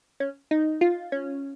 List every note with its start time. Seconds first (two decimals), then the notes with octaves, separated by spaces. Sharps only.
0.20 C#4
0.51 D#4
0.81 F4
1.12 C#4